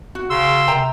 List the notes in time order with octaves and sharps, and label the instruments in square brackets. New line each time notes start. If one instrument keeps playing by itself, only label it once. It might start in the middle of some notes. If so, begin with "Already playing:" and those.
[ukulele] F#4
[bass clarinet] C#3 [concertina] C6 E6
[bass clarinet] C3 [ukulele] G5 A#5